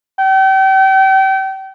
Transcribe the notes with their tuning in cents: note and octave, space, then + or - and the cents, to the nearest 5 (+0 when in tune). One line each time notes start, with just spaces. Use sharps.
G5 -35